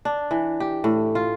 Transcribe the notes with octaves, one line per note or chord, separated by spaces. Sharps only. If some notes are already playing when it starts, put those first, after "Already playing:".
D4
E3
G4
A2
F4